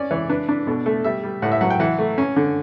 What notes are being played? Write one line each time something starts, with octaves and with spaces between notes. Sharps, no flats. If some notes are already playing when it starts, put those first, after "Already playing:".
Already playing: C#4 D5
E3 C#5
D4 B4
D4
B2 A4
A3 A4
G3 E5
G3
A2 F#5
E5
F#3 F#5
G5
E3 F#5
A3
C#4
D3